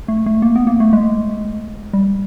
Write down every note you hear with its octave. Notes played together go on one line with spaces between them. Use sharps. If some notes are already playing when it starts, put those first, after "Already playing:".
A3
A3
A#3
B3
A#3
A3
G#3
G3